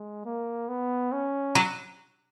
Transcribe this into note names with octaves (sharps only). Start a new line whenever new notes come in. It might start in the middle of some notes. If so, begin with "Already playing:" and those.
Already playing: G#3
A#3
B3
C#4
F#3